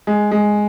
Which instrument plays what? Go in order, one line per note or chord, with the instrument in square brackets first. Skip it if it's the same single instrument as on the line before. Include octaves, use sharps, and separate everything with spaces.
[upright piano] G#3
G#3